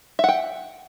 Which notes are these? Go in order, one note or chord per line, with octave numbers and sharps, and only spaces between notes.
E5 F#5 G5